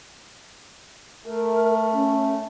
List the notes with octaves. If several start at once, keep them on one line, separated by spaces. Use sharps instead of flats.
A3 A#4
C#4